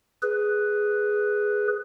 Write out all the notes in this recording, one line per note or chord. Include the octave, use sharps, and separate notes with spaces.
G#4 B4